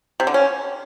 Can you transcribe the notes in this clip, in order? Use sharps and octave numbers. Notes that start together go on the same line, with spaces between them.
C3
D3
C#4